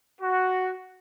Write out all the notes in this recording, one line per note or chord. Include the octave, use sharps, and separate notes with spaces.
F#4